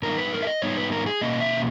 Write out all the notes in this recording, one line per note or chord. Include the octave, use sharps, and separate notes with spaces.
G#2 G3 B3 D#4 A#4
B4
A#4
E5
D#5
G#2 G3 B3 D#4 C#5
B4
A#4
G#4
B2 A#3 C#4 D#5
E5